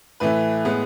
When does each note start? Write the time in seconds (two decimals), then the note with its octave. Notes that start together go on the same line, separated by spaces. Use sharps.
0.20 A2 E3 A3 B4
0.65 A2 G#3 B3